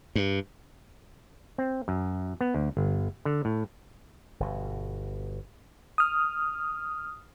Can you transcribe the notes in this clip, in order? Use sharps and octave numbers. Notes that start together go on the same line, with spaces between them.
G2
C4
F#2
B3
D2
G1
D3
A2
G1 B2
D#6 F6